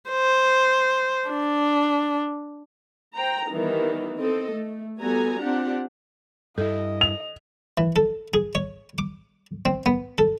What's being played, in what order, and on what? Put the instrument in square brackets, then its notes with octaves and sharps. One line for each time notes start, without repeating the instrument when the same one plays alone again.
[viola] C5
D4
[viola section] C5 G5 A#5
D#3 E3 G3 B3 D#4
C4 A4 D#5
A3
G3 B3 F#4 A4 G#5 A#5
C4 D4 F4 G4 F#5
[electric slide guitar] G2 E4 [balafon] A4 [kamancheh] D#5
[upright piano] F7
[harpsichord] E3
A4
G#4
C#5
D6
C4
B3
A4